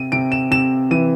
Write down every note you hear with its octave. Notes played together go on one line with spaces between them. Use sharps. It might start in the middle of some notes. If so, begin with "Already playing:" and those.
Already playing: C3 D#7
C3 D7
E7
C3 E7
E3 D#7